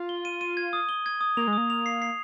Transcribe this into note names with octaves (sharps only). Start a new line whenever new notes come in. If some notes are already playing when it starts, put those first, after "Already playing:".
Already playing: F4
G7
D#7
D#7
G#6
D#6
G7
G#6
D#6
A#3 F7
G#3
A#3 D#6
F7
C7
C7